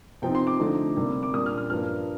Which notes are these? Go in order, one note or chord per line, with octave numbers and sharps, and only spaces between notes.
C3 F3 C4 D#4 G5
C6
D6
D3 F3 A3 C4 D#4
C3 G3 A#3
D6
A#2 G3 D4 D#6
F6
F6
G2 F3 A#3 D4 F6